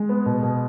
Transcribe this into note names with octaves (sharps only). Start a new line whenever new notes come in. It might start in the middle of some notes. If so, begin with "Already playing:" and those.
Already playing: G#3
B3
B2
B2